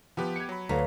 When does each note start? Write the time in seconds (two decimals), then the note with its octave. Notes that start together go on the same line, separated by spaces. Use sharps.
0.17 F3 B3 G4 B4
0.36 G#6 C#7
0.49 F#3 B5
0.69 D2 B4 C#5 F5 A#5